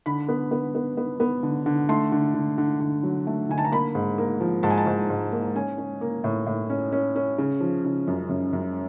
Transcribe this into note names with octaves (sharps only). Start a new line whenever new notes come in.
D3 B5
B3
B3
B3
B3
B3
D3
D3
A3 C6
D3
D3
D3
D3
F#3
A3
D3 G#5
A5
A#5
A#3 B5
G#2
A#3
F3
G#2 A5
G#5
A5
G#2
G#2
A#3
C#4 G#5
C#4
A#3
A2
A2
C#4
C#4
C#4
C#3
F3
C#3
F#2
F#2
F#2